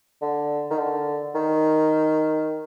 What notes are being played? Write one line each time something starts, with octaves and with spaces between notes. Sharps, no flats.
D3
D#3
D3
D#3